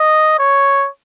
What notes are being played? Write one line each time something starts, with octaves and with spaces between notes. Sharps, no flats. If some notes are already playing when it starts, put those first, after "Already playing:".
Already playing: D#5
C#5